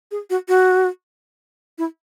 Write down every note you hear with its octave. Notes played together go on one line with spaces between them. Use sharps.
G#4
F#4
F#4
E4